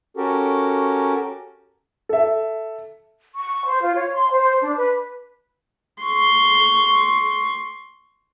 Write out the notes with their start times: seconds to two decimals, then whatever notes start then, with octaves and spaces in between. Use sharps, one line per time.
0.17 C#4 F#4 G4 A4 A#4
2.09 A4 E5
3.36 C#6
3.66 C5
3.82 F4
3.95 C#5
4.13 C6
4.30 C5
4.62 D4
4.77 B4
6.03 C6 C#6